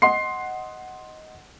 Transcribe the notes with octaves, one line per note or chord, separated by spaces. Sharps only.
D#5 F#5 C6 C7